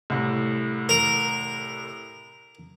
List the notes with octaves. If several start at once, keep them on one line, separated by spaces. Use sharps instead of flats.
C2 A2
A#4